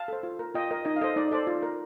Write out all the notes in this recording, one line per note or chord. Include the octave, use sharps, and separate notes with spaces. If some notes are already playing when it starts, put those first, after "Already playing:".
Already playing: F5 A5
A4 C5
F4
A#4
F4 D#5 G5
A#4 D#5
D#4 D#5
F5
A4 C5 D#5
D#4 D5
A4 C5 D5
F4
A#4